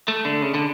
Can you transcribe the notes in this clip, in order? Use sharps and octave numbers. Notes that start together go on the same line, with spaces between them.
A3
D3
C#3
D3